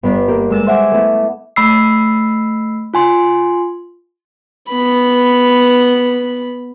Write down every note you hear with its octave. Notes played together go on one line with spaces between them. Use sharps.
G1 B3 D4 B5
A#3 G4
G#3 E6 A6
C5 E5 F#5 G#5 D6
A3 B3 E4
A3 B5 E6 C7
F4 G#5 C6
B3 B5